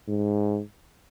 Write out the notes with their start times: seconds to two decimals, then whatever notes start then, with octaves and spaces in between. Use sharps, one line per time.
0.08 G#2